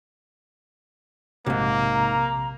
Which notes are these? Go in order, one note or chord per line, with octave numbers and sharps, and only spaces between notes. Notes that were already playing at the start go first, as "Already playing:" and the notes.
A#1 E2 G#2 C3 A#3
A#5